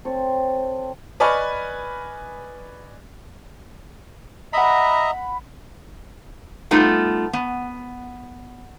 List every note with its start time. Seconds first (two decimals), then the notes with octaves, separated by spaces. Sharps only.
0.05 C4 A4 C#5
1.20 B4 D5 D#5 G#5 C#6 F6
4.53 D#5 E5 F#5 A#5 B5
6.71 G3 A3 B3 D#4 F4
7.33 B3